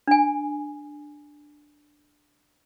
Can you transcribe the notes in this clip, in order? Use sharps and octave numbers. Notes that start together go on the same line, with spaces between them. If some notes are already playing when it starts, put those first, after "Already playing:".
D4 G#5